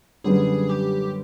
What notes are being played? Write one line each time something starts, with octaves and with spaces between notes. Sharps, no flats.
F#2 D3 G3 B3 G#4
G4